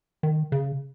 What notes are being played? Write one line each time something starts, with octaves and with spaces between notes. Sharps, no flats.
D#3
C#3